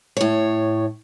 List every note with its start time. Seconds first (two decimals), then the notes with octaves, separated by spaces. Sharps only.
0.17 A2 C#5